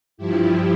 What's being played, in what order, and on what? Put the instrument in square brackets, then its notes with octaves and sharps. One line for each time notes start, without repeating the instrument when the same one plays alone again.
[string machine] G2 F3 E4 G4